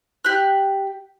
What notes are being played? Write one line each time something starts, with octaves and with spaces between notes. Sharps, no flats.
G4 F#6